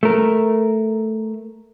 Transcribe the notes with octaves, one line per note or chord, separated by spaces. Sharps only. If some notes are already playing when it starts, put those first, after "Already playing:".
A3 A#4